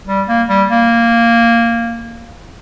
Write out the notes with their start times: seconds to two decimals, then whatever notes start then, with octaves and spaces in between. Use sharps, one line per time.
0.07 G3
0.28 A#3
0.49 G3
0.70 A#3